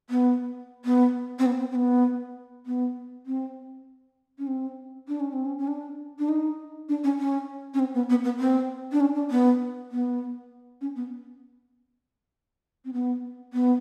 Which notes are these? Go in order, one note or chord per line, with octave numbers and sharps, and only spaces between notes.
B3
B3
C4
B3
C4
C4
B3
B3
C4
C#4
C4
D4
C#4
C4
C#4
C#4
D4
D4
D#4
D4
C#4
C#4
C#4
C4
B3
B3
B3
C4
D4
C#4
D4
B3
B3
C#4
B3
C4
B3
B3